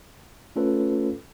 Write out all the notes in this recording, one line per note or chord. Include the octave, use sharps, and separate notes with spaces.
A3 C#4 F4 A4 B4 C#5